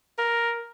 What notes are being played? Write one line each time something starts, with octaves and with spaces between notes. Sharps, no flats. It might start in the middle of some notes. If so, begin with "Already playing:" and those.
A#4